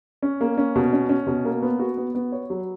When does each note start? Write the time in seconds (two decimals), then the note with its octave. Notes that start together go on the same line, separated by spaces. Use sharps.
0.22 C#4
0.41 A#3
0.58 C#4
0.76 B2
0.93 C#4
1.09 C#4
1.27 B2
1.45 A#3
1.62 B3
1.79 F#4
1.98 B3
2.15 B3
2.32 C#5
2.50 F#3